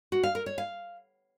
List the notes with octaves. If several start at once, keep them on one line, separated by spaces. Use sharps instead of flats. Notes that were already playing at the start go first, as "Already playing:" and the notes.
F#4
F5
A#4
C#5
F5